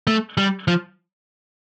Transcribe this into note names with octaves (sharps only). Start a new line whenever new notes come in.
A3
G3
F3